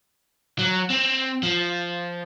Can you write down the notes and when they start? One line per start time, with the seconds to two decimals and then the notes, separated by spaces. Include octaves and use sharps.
0.59 F#3
0.90 C4
1.43 F3